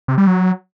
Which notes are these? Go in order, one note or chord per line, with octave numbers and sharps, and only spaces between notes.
C3
G3
F#3